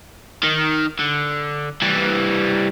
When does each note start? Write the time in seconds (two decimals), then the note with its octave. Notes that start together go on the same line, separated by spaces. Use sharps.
0.44 D#3
0.99 D3
1.82 E3 G3